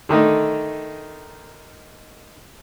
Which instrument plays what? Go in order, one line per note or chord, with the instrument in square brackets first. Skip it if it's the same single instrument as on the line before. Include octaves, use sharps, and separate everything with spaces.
[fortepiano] D3 D#3 A3 D#4